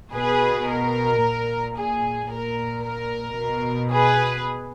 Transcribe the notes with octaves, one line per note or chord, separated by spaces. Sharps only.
B2 G#4 B4
A#4
A#2
G#4
A#2 A#4
A#4
B2
G#4 B4